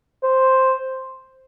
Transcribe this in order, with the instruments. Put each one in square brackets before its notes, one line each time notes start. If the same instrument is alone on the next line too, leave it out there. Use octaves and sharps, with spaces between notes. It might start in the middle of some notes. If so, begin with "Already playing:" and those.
[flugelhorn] C5